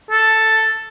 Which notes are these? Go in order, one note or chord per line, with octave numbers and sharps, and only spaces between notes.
A4